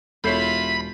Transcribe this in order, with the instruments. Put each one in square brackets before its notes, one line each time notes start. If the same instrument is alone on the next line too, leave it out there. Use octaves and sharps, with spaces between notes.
[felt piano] E1 G6 C7 [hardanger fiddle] E4 F4 [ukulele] A4 C#5 [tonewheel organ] B5